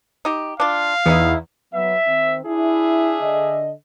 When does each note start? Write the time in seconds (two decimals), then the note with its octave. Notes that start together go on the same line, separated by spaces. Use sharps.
0.25 D#4 G4
0.60 D4 F4 F5
1.06 E2 B3 D#4 E4
1.74 F#3 B3 E5
2.07 D#3 C4
2.45 D4 E4 G#4 E5
3.21 D3 D#5